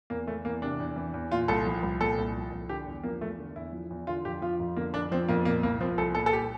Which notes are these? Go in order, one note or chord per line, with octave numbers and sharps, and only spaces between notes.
E2 A#3
E3 A3
E2 A#3
C3 D4
E2
E3
E2
A#2 F4
C2 A4
F3
C2
A#2 A4
C2
F3
C2
D3 G4
E2
F3 A#3
E2 A3
D3
E2 E4
F3
E2
D3 F4
F2 G4
F3 F4
F2
D3 A#3
F2 D4
F3 C4
F2 A#3
A#2 A#3
C2 A#3
F3 C4
C2 A4
A#2 A4
A4
G4